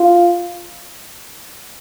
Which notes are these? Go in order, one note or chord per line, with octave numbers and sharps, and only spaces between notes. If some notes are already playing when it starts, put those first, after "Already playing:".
Already playing: F4